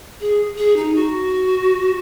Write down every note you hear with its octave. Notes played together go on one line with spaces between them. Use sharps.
G#4
G#4
D#4
F#4